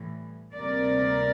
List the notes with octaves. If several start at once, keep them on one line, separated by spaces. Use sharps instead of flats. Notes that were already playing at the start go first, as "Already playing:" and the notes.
Already playing: A2 E3 G3
D2 C3 G3 A#3 A#4 D5